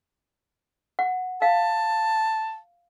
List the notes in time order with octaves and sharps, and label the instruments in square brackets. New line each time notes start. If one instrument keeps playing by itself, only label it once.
[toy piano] F#5
[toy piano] F5 [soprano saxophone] A5